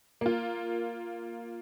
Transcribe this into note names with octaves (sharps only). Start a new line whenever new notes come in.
A#3 F4